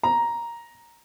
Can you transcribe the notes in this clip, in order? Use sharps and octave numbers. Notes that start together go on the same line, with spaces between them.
A#5